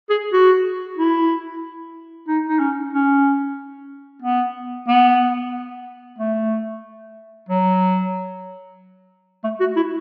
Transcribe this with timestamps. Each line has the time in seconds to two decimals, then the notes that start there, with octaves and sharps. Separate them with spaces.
0.10 G#4
0.32 F#4
0.97 E4
2.28 D#4
2.49 D#4
2.59 C#4
2.93 C#4
4.22 B3
4.88 B3
6.18 A3
7.49 F#3
9.44 A3
9.60 F#4
9.76 E4